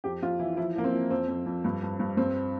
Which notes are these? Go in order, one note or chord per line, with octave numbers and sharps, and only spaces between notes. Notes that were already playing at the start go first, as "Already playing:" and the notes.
F2 G4
F2 F4
E3 E4
F3 E4
F3 A#3
C4
F3
F2 C4
F2
F2
G2
G2
G2
G2 C4